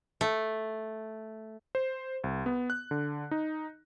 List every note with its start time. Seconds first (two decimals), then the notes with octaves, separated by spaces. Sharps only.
0.21 A3
1.75 C5
2.24 C2
2.46 B3
2.70 F#6
2.91 D3
3.31 D#4